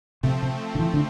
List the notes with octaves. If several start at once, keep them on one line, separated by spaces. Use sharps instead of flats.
C3 F3 A3 C4
C3
D3
E3
D3